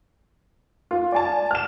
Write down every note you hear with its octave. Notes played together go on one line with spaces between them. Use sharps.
F4
D5 G#5 A5
F6 E7